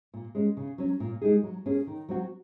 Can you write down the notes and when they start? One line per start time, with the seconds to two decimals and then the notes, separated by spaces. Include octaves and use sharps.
0.14 A#2
0.35 G#3 C#4
0.57 C#3
0.78 F#3 C#4
1.00 A#2
1.22 G#3 D#4 G#4
1.43 F#3
1.66 A#3 C#4 G#4
1.87 D#3
2.09 F#3 C4 F#4